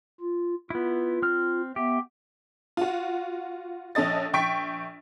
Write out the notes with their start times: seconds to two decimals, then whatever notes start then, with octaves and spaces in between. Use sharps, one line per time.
0.21 F4
0.70 B3 E4 F4
1.22 C4 F6
1.76 B3 G4 E5
2.77 F4 F#4
3.95 A#1 C#4 A4 D#5 A6
4.33 A#1 G5 C#6 B6 D7